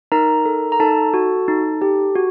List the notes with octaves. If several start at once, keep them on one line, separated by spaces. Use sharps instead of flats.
D#4 A#4 A#5
A4
A#5
D#4 A4 A5
F#4
D#4
G4
F#4